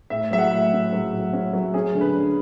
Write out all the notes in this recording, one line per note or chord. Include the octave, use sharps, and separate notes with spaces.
A2 E5
F#3 E5
F#5
A2
C#4
F#3
A2
C#4
F#3
C#4 G#4
D3
B4
D3